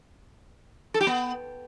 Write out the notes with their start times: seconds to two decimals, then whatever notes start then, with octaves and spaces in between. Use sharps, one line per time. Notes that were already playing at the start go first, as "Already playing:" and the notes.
0.94 A4
1.01 G4
1.07 B3